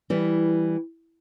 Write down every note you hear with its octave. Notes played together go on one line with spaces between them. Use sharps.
E3 G3